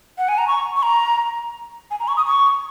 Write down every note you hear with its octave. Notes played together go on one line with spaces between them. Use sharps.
F#5
G#5
A#5
C#6
C#6
A#5
G#5
A#5
C#6
D#6
C#6